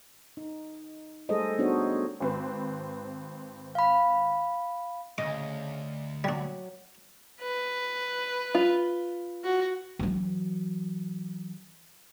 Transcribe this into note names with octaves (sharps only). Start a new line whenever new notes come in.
D#4
G3 A3 G#4 A4 C5 D#5
B3 D4 D#4 F#4 C5 C#5
G#1 C4 B4
F5 B5
D2 G2 C#3 D#5 D6
F#3 G3 D4
B4
F4
F#4
E3 F#3